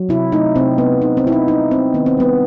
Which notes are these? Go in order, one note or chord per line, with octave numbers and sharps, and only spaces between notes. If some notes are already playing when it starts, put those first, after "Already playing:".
Already playing: F#3
C3 E4
A3 D#4
C3 C4
C3 B3
C3 D#4
C4
C3 E4
D#4
G3 D#4
G3 C4
D#3 B3
C4
G3 B3